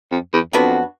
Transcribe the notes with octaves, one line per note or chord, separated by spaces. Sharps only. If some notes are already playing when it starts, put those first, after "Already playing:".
F2
E2
F2 F#3 B3 D4 F#4